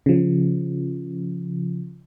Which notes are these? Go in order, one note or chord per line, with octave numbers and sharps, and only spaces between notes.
C#3 F3